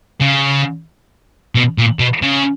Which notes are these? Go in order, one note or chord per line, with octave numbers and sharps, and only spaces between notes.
C#3
B2
A#2
B2
C#3